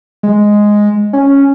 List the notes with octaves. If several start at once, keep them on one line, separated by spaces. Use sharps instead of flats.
G#3
C#4